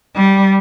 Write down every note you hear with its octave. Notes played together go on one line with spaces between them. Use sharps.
G3